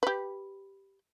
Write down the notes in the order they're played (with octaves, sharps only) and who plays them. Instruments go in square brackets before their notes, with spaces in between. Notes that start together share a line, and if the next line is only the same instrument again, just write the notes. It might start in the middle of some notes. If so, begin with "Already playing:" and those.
[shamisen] G4 B4